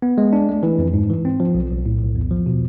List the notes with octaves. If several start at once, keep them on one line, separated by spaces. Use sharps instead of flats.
B3
G#3
D4
A3
E3
F2
G#2
E3
C4
F3
B1
B1
A2
B1
E2
F3
B2